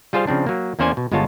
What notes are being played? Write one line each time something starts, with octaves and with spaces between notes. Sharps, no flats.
G3 F4 G#4 C5 F5
C#3 F3 C4 D4
F#3 A#3
E2 A#3 C#4 C5 D5 G#5
B2
G1 G#3 B3 F4 C#5 A5